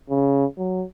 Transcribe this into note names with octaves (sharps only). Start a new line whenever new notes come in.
C#3
F#3